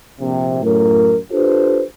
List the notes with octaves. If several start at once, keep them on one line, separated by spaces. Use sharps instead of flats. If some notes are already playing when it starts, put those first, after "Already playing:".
A#1 C3
F#2 A2 A3 A#4
D4 F4 G4 A4 B4 C5